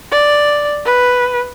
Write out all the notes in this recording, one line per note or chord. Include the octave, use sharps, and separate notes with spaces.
D5
B4